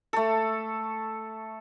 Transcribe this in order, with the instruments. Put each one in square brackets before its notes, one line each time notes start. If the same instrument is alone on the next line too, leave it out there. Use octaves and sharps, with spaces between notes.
[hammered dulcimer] A3 A4